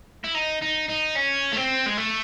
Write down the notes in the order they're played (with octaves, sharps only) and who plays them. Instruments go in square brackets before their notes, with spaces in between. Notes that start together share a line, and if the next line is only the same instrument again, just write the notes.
[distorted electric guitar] E4
D#4
D#4
D#4
C#4
A3
C4
G#3
A3